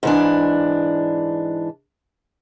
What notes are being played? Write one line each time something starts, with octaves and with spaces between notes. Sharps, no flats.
G#2 E3 D4